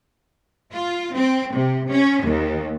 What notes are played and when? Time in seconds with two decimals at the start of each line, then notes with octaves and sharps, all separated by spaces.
0.72 F4
1.14 C4
1.55 C3
1.89 C#4
2.23 D#2